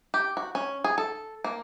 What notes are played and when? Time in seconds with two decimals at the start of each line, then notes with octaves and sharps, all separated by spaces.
0.14 G4
0.37 F#4
0.55 C#4
0.84 G#4
0.98 A4
1.44 A#3